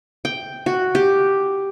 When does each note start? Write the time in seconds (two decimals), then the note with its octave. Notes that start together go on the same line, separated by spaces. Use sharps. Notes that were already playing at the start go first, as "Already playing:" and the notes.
0.25 G5
0.66 F#4
0.95 G4